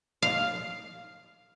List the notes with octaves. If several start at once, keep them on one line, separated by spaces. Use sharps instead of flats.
F5